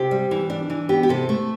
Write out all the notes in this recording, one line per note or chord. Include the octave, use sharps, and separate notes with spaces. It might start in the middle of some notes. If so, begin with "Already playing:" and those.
Already playing: C3 G4
G3
E3
D4
E3
B3 G4
G4
C3 A4
A3